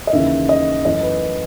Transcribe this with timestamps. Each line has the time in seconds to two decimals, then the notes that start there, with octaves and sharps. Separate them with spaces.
0.07 D#5
0.13 D#2 C#3 E3 E5
0.49 D#5
0.85 F#2 E3 A3 C#4 D#5
1.03 B4